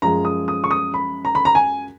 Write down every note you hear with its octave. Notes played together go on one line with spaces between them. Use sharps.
F#2 F3 G#3 A#5
D#6
D#6
C#6
D#6
B5
A#5
B5
A#5
G#5